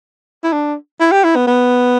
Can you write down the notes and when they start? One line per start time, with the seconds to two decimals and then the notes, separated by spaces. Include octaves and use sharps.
0.44 E4
0.52 D4
1.00 E4
1.12 G4
1.24 E4
1.36 B3
1.47 B3